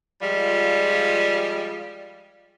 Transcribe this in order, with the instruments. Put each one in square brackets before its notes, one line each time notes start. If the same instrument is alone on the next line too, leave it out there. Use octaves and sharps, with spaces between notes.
[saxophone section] F3 G3 G#3 F4